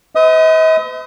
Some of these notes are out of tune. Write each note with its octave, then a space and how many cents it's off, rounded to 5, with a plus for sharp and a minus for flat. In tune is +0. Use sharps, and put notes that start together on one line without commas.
B4 +45 D#5 +45 D#6 +0